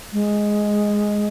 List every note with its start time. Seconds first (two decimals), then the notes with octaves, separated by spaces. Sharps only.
0.13 G#3